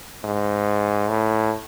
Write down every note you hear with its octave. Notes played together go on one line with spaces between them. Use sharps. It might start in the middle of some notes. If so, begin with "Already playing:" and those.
G#2
A2